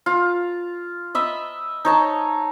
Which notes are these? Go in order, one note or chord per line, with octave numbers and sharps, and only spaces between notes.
F4
D#5 E5 B5
D#4 C#5 A5